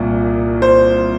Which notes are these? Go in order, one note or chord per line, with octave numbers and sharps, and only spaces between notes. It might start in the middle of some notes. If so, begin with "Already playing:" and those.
Already playing: C2 A#2
C5